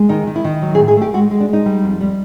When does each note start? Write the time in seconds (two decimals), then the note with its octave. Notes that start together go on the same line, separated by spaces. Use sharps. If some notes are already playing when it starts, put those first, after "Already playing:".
Already playing: G#3
0.09 D#3 D#4
0.27 D#3
0.36 E4
0.44 D#3
0.62 F#3
0.75 G#4
0.79 A2
0.88 G#4
0.97 A3 G4
1.14 G#3 F#4
1.31 G#3
1.40 D4
1.49 G#3 D#4
1.66 G3
1.84 F2
2.01 G3